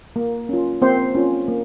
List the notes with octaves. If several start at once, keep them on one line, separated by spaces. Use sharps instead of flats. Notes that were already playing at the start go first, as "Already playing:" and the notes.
A#3
C#4 F4
A#3 C4 C5
C#4 F4
A#3